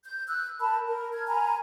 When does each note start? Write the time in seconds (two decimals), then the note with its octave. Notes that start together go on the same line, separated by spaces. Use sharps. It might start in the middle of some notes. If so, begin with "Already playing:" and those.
0.04 G6
0.28 E6 F#6
0.60 A#4 A5 B5
0.88 A#4
1.13 F6 G#6
1.28 G#5 A#5 B5